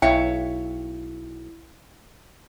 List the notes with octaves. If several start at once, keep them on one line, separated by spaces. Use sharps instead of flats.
B1 E4 C#5 E5 F5 G5